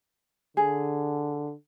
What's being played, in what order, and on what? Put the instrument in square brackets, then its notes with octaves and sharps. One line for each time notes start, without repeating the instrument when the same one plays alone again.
[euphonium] D3 [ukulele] G#4